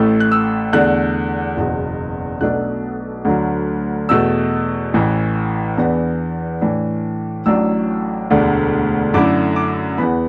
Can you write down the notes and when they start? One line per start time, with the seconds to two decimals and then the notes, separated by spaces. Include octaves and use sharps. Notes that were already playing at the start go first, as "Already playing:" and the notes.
Already playing: A1 A2 A3
0.20 F#6
0.32 E6
0.73 E2 D3 A3 D4 F#6
1.57 F#1 E2 B2
2.41 B1 B2 F#3 A3 D4 F#6
3.25 D2 D3 F#3
4.09 E2 B2 A3 E6
4.94 A1 A2 E3
5.77 E2 E3 B3 D4
6.61 A2 E3 D4
7.46 A1 A2 F#3 D4 E6
8.30 E1 D2 D3
9.14 F#2 D3 A3 E4 D6
9.56 D6
9.98 E2 E3 B3 B5